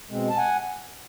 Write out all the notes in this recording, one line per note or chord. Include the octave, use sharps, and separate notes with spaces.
B2 G#3 C4
A5
F#5 G#5